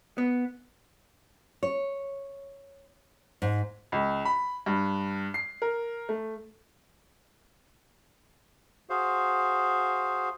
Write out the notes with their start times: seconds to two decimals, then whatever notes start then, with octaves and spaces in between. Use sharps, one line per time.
0.18 B3
1.63 C#5
3.42 G#2
3.92 C#2
4.25 B5
4.66 G2
5.34 C7
5.62 A#4
6.09 A3
8.90 F#4 G#4 C5 F5